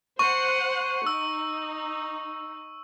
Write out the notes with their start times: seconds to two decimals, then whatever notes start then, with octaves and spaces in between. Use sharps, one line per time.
0.19 C5 F#5 C#6
1.07 D#4 E6